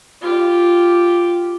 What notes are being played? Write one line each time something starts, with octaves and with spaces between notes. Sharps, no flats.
F4 G4